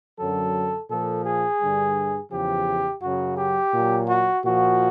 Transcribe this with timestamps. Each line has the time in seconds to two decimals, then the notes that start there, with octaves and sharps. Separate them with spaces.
0.20 F#2 D3 F#3 A4
0.90 A#2 F3 A4
1.26 G#4
1.62 G2 D3 G3
2.32 E2 C#3 F3 G4
3.02 F#2 C#3 F#3 F#4
3.38 G4
3.74 A#2 F#3
4.09 F#4
4.44 A#2 F3 F#4